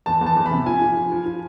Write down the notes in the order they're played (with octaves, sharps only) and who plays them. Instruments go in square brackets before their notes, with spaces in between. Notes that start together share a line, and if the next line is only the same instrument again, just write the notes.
[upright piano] E2 A5
E2
A5
E2
B5
C3
F3 G#5
F3
F3
F3
F3